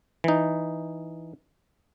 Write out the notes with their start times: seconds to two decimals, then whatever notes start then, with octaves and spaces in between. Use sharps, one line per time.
0.24 E3 D#4